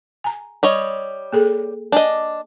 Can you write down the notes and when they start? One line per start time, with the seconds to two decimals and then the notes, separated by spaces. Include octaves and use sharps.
0.24 G#5 A#5
0.63 G3 C#5 D#5
1.32 A#3 G#4 A4
1.92 D4 D#5 G#5 D6